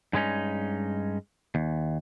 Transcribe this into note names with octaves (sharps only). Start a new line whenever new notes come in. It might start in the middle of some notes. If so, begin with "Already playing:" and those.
G2 G#3 C#4 D#4
D#2